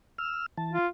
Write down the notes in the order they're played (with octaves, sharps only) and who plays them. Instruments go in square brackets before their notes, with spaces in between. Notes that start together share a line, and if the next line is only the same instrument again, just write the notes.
[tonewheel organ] E6 F6
E3 A5
[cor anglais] F4